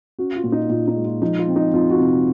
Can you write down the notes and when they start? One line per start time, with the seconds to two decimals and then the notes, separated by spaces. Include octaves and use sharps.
0.19 C#4 F#4
0.35 F4
0.44 A#2
0.52 D#4
0.69 A#2 F4
0.88 D#4
0.96 G#3
1.05 F4
1.22 F3 D#4
1.39 F4
1.48 C4
1.56 D#4
1.72 F2 F4
1.90 F#4
1.99 C3